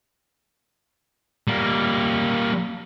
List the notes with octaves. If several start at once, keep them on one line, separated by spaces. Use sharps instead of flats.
G3 A#3